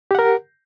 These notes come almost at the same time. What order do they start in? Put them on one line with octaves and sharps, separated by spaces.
G4 F#5 A#4